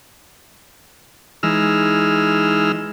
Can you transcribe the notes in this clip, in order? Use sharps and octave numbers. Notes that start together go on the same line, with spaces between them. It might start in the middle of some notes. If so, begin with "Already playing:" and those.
E3 G#3 D#4 E6 F6